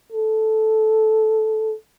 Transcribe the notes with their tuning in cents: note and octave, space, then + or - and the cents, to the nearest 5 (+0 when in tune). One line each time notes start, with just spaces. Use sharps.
A4 -10